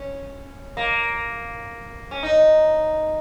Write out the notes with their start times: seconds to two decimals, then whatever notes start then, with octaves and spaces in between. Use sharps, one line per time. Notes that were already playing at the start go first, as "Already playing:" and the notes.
Already playing: C#4
0.77 A#3
2.11 C#4
2.23 D#4